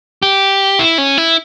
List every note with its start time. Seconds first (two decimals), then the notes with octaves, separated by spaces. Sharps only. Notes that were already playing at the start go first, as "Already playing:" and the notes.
0.23 G4
0.79 E4
0.98 C#4
1.18 E4